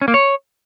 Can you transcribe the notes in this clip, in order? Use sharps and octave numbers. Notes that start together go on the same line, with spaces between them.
C#4
A#3
C#5